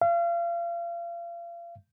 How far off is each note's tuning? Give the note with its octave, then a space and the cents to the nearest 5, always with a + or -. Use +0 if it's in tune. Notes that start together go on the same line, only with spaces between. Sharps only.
F5 -35